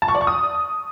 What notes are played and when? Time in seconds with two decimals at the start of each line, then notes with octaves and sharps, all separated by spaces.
0.02 A5
0.08 C#6
0.15 D5
0.21 C#6
0.27 D#6